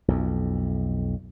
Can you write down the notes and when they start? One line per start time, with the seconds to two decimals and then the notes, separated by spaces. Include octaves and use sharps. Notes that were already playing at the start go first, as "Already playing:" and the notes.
0.08 B1 F2